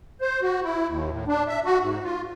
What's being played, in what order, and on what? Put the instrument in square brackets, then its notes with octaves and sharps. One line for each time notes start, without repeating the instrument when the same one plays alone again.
[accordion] C5
F#4
E4
D#2
A2
D4
E5
F#4
G#2
F4